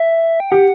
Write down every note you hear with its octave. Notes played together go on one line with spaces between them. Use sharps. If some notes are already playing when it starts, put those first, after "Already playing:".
Already playing: E5
G5
G4 F#5